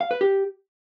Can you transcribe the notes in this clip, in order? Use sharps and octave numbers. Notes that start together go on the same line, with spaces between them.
F5
B4
G4